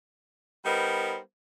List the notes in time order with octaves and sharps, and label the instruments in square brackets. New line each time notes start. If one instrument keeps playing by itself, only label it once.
[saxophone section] G3 B3 D#4 A#4 C5